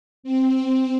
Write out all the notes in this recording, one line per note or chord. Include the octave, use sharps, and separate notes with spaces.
C4